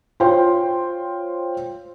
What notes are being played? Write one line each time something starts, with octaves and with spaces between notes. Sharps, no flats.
F4 C5 C#5 G5 C6